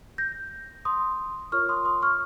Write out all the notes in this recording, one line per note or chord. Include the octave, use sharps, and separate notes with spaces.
G6 A#6
C6 D#6
F4 A#4 C#5 C#6 F6
C6 D#6
C6 D#6
C#6 F6